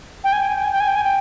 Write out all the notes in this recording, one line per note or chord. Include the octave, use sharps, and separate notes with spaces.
G5
G#5
G5
G#5
G5
G#5
G5
G#5
G5
G#5
G5